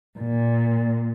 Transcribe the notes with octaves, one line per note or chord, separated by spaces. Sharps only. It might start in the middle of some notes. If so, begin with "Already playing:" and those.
A#2